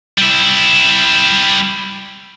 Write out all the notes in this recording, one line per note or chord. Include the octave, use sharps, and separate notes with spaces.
G3 E4